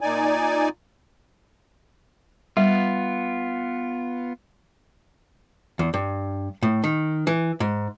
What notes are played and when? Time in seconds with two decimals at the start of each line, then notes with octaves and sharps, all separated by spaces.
0.01 A#2 D#4 D5 G#5
2.57 G3 B3 F4
5.79 E2
5.94 G2
6.63 A2
6.84 D#3
7.27 E3
7.60 G#2